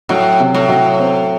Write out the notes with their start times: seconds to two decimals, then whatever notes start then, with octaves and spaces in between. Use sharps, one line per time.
0.09 A2 F#3
0.40 C3
0.54 A2
0.69 F#3
0.99 C4